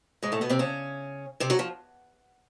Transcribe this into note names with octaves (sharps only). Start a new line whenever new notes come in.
G#2 G#3
A2 A3
B2 B3
C3 C4
C#3 C#4
C3 C4
F#3 F#4
F3